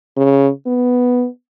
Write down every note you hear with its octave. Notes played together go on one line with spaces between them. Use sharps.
C#3
B3